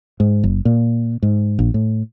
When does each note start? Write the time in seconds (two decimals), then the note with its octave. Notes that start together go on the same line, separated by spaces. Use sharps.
0.20 G#2
0.44 F#1
0.65 A#2
1.22 G#2
1.59 A#1
1.74 A2